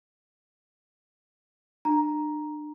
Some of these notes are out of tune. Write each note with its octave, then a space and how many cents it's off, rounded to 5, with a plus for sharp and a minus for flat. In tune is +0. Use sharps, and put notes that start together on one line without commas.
D4 +40 A#5 +5